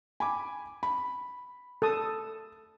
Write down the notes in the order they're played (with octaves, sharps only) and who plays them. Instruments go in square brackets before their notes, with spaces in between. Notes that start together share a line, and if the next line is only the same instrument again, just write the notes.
[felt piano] G#5 B5 D6
B5
[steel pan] A4 A5 D#6